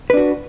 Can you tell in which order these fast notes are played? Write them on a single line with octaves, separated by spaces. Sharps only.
B4 D4 F#4